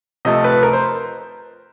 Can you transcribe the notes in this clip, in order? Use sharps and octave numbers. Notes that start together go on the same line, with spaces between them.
C3 F3 A3 D#5
B4
A#4
C5